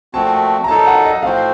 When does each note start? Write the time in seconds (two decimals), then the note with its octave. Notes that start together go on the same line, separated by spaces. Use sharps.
0.14 A#2 F3 A3 C4 F#4 A5
0.64 A#5
0.68 A#2 F#3 A#3 D#4 A4 A5
0.87 F#5
1.05 D#5
1.22 A2 F3 C4 F#4 C5 F5